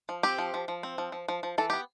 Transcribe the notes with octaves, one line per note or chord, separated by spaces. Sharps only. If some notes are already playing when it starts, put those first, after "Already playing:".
F3
C4 G4
F3
F3
F3
C4
F3
F3
F3
F3
E3 A4
B3 G4